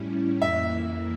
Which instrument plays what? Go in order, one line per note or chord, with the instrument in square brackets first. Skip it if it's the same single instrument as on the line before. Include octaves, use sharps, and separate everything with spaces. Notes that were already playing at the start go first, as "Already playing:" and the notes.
Already playing: [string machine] A2 G3 C#4 E4
[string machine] F2 E3 A#3 E4 [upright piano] E5